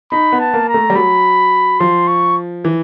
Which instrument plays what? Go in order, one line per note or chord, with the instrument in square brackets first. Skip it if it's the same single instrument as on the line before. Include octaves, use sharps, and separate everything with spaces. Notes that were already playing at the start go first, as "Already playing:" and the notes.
[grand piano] D#4 [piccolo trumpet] B5
[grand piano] B3
[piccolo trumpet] A5
[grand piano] A#3
[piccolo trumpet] A#5
[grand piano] A3
G3
[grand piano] F#3 [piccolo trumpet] B5
[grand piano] F3 [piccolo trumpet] C6
[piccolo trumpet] C#6
[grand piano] E3